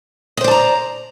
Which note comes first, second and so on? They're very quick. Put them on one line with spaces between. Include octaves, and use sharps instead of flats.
D#5 C5 D5 A5 A#5